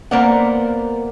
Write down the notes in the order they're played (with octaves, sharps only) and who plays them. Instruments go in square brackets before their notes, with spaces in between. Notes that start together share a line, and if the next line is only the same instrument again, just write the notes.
[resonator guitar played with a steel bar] A#3 B3 A#4 C5 D5 F#5